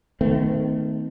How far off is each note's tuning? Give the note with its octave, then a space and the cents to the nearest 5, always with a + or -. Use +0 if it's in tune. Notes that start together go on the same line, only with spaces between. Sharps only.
D#3 +0 A3 +0 C4 -45